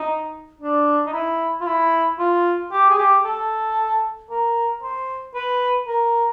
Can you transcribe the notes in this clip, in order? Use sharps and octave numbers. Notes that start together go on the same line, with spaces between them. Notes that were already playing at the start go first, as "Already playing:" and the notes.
Already playing: D#4
D4
D#4
E4
F4
E4
F4
G4
G#4
G4
A4
A#4
C5
B4
A#4